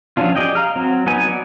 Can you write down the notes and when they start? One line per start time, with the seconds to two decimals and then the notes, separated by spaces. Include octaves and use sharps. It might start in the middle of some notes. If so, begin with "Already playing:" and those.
0.17 F3 F#3 C#4 D4 F4
0.35 G4 G#4 D5 D#5 G5
0.55 F5 A#5 F6
0.75 F#3 C4
1.06 F#3 B3 D#4 G#5
1.28 B3 D5